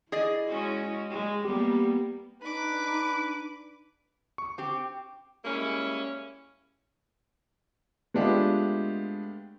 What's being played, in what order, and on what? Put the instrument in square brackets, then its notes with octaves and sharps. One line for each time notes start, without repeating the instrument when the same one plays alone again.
[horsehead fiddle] E4 [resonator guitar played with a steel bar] G#4 D5 D#5
[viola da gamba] G#3 C#4 F#4
G#3
[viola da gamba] G3 A#3 [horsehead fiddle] B3 [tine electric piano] G4
[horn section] D4 B4 [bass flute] D#4 [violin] B5 D6
[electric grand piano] C#6
[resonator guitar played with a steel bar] C4 G4
[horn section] G3 G#3 A#3 C#4 E4
[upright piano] G#3 A3 B3 D4 F4 G4